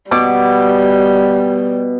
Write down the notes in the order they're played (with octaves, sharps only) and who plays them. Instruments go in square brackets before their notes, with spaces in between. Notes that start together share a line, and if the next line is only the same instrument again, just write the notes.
[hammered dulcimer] B2 D6 [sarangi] G3